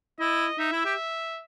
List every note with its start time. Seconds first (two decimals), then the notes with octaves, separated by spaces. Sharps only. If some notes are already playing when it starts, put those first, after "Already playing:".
0.19 E4 D#5
0.58 D#4 E5
0.72 E4
0.85 G4